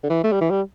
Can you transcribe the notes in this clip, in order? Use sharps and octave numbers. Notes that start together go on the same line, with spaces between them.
D3
E3
A3
G3
E3
G3